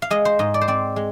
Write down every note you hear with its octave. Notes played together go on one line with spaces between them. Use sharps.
F5
G#3 D#5
C5
G#2 D#5
D5
C5
C4 D5
G#3